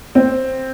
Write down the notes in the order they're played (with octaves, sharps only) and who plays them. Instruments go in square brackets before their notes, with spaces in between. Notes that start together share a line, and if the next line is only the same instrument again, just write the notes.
[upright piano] C4